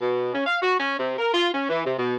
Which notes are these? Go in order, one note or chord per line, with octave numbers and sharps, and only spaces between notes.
B2
C#4
F5
F#4
C#4
C3
A#4
F4
C#4
E3
C3
B2